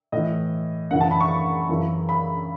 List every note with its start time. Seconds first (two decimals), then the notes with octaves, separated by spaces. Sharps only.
0.12 A2 E3 D#5
0.91 F#2 C#3 E3 F#5
1.01 A5
1.11 B5
1.21 C#6
1.69 F#2 C#3 E3
2.09 B5